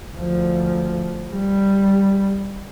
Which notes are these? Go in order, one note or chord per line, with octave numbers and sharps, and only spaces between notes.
D2 F3
G3